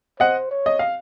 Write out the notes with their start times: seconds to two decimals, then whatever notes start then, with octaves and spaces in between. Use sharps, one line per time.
0.20 C5 D#5 F#5
0.51 C#5
0.66 D#5
0.79 F5